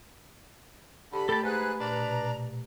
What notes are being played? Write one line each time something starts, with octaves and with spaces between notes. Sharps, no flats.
D3 G4 B5
A3 G4 A4 A5
G#2 G#4 B4 F#6
A#2 D4 A#5
B2